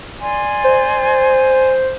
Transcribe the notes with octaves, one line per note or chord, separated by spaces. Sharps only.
D5 G#5 C6
C5